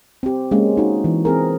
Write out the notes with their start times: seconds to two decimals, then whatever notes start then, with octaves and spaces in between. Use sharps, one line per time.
0.23 C4 G4
0.51 G#3 A#3 C#4
0.77 D#4 F#4
1.04 E3
1.25 C4 G#4 A#4